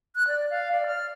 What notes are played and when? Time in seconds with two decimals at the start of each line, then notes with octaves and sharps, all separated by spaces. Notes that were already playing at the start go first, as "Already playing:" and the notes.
0.16 F#6
0.28 D5
0.50 F5
0.72 D5
0.87 F6